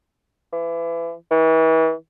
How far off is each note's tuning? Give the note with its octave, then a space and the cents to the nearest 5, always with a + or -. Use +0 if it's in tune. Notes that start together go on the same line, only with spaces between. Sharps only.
E3 +30
E3 -35